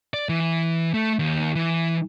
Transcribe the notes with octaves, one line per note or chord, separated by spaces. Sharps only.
D5
E3
A3
D#2
E3